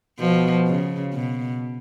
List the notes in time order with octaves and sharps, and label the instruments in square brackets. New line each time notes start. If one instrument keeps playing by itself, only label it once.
[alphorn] B2 [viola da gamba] F3
[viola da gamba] C#3
B2